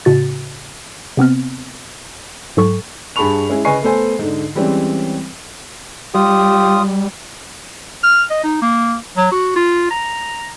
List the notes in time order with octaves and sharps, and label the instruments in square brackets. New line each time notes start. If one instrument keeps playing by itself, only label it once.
[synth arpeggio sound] A2 C#3 F#4 A6
C3 B3 C4 F6
G#2 F#3 A4 C#6
[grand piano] G2 G#4 A5 B5 C#6 F7
G#3 C#4 E4 G#4
C#3 B4 D#5 G#5 C#6 C7
A3 B3 A4 C5 G#5
G#2 D3
E3 G3 G#3 C4 C#4
[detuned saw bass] G3 [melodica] F4 D#6 [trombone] G4
[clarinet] F6
D#5
D#4
A#3
F#3
F#4
F4
A#5